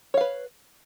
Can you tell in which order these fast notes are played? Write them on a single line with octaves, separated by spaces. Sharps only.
C#5 F5 B4